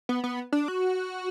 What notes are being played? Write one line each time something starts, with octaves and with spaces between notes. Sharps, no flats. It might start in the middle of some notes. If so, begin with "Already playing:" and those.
B3
B3
D4
F#4